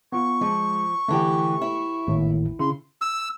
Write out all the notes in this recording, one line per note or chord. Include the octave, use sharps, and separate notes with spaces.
B3 F4 C#6
F3 G#3
D3 E3 A3 G4
E4
G#1 D#2 A2
C#3 E4 C6
E6